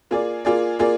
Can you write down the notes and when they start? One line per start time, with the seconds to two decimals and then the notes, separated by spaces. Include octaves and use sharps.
0.11 A#3 F4 G#4 D5
0.45 A#3 F4 G#4 D5
0.79 A#3 F4 G#4 D5